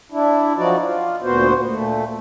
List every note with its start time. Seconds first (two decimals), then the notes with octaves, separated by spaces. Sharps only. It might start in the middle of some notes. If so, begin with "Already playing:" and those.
0.12 D4 E4
0.57 F3 F#3 D#4 F#4 D5
0.83 F4
1.22 D2 A#2 B3 F#4 C5
1.68 A#2 A3